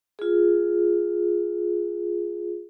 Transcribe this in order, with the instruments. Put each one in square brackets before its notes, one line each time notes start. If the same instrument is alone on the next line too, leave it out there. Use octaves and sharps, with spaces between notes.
[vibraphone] F4 G#4